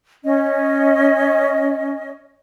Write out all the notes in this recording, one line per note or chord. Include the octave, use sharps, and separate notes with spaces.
C#4 D#5